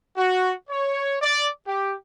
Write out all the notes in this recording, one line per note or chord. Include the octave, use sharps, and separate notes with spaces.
F#4
C#5
D5
G4